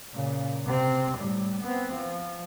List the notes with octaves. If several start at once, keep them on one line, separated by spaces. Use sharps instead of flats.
A#2 C#3
C3 C4
A2 G3
B3 C4
F3